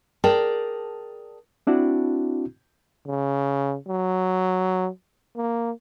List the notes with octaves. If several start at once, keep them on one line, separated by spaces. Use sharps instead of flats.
G#4 A#4 D5 G5 A5
C4 D4 E4 F#4
C#3
F#3
A#3